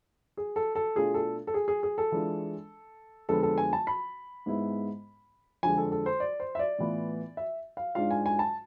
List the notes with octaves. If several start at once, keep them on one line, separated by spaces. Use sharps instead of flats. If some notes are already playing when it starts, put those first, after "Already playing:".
G#4
A4
A4
B2 A3 D4 F4 G#4
A4
A4
G#4
G#4
G#4
A4
E3 G#3 D4 F4
F2 D3 G#3 B3 A4
A4
G#5
A5
B5
G#2 G#3 B3 E4
F2 D3 G#3 G#5
A4
A4
C5
D5
C5
E5
D5
A2 E3 B3 F4
E5
F5
G#2 G#3 D4 F4 F5
G#5
G#5
A5